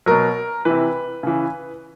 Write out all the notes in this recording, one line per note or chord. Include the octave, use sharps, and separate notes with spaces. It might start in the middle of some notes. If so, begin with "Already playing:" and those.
B2 F#3 A#4
C3 E3 B4
C#3 E3